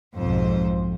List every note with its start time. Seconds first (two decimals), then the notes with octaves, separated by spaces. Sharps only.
0.15 B1 F2 G#2 C5